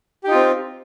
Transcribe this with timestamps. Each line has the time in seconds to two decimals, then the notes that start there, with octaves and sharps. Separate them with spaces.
0.24 G4
0.28 D#4
0.31 F4
0.35 C4